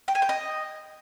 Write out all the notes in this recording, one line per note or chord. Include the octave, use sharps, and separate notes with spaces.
G5
G#5
G5
D#5